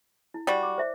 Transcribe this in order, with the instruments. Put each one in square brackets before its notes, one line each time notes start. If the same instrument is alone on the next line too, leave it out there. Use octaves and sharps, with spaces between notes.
[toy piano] E4
[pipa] G3 F#4 [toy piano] D5
[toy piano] D6
C5 E5